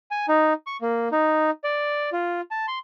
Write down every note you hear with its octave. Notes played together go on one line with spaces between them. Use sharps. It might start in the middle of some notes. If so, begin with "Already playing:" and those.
G#5
D#4
C#6
A#3
D#4
D5
F4
A5
C6